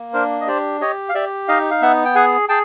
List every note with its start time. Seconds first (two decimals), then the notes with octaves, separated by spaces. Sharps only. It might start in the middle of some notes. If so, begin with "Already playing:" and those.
Already playing: A#3
0.13 D4 A#4 C5
0.41 D#5
0.47 G4 C5 D5
0.81 G4 C#5 D#5
1.09 F5
1.15 G4 D5 E5
1.48 D#4 D#5 F5
1.71 F5
1.82 B3 E5 F#5
2.05 G5
2.15 G#4 F#5 G#5
2.49 G#4 G5 A5